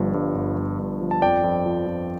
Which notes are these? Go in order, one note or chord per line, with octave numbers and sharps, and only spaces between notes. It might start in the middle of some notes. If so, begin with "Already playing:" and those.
Already playing: G1 G2 F3
G2
G1
G1
G2
F3
A5
F2 D5 G5
F2
F3
F2